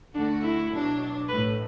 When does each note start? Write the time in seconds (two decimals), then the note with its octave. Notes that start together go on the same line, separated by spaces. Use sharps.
0.14 D2 D3 A3 D4 F#4
0.43 E4
0.72 B2 F#3 D4
1.29 A1 A2 A3 B4